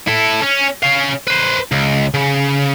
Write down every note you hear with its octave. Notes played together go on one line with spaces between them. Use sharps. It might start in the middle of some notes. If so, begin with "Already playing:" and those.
E4 A4
C#4
C#4 F5
B4 C5
C#2
C#3